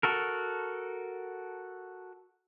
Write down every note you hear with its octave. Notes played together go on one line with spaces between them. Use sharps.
F#4 A4 A#4